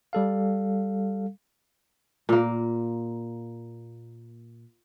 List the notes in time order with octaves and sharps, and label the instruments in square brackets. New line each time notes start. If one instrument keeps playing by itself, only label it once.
[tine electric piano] G3 A4 F5
[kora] A#2 A#3